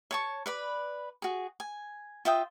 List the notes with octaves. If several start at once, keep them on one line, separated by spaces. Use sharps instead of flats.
C#5 A5 C#6
B4 D5 B5
F#4 G#4
G#5
F4 E5 G5 D#6